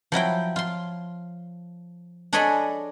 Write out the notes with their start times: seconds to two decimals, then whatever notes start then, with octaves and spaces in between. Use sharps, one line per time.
0.12 F3 F#3 E4 G5
0.56 F4 C6
2.33 D4 G#4 A4 C#5 D#5 B5